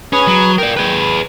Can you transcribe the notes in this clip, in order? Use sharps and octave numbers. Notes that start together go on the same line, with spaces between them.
C#4 G#4 B4
F#3
A#4 D5 G5
G#4 B4
B5